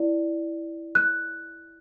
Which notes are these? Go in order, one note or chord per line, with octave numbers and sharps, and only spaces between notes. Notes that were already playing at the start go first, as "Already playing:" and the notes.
Already playing: E4 D5
F#6